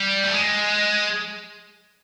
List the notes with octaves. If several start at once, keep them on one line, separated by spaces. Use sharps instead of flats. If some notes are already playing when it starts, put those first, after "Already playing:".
Already playing: G3
A3
G#3